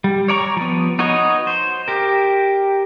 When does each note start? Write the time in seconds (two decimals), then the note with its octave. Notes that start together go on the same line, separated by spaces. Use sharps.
0.04 G3
0.28 C#5 D5 A#5 C#6
0.56 F3 B3
0.99 D#4 F#4 B4 C#5 D#5
1.47 C5
1.88 G4 A#4